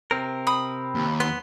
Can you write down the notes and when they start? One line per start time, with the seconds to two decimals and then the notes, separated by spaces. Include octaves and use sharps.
0.11 C3 C4 A#4
0.47 B5 D#6
0.95 D#2
1.20 B3 C6